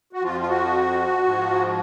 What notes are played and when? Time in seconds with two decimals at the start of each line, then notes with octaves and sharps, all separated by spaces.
0.13 F#4
0.23 F2 F3 F4
0.40 F4
0.49 F#4
1.24 G#2 F3